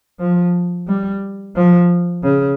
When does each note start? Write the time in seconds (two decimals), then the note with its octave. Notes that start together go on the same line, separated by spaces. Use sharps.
0.19 F3
0.87 G3
1.56 F3
2.24 C#3